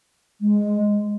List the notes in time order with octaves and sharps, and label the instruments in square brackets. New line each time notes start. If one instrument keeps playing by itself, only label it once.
[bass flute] G#3